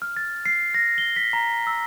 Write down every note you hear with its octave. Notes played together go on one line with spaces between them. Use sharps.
F6
A6
C7
A#6
G7
B6
A#5
E6